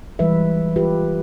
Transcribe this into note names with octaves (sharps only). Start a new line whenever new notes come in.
E3 G3 G#3 B4 E5
F4 G4 B4